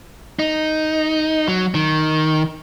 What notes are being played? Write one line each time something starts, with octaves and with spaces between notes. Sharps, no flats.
D#4
F#3
D#3